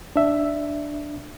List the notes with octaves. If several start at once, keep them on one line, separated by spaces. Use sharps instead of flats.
D4 E5